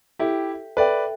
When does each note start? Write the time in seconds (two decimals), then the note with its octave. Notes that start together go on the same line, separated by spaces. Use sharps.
0.19 E4 G4 A4 E5 G5
0.77 A4 B4 D5 E5 G5